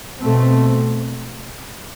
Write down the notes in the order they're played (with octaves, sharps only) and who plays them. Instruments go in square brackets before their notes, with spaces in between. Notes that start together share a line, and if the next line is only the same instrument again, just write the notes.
[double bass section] B2 A3 C4